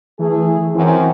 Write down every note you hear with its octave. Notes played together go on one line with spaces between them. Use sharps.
E3 A3 G#4
F#2 E3 C4